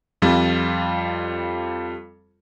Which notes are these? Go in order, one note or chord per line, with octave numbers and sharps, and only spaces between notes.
F2 G3 F4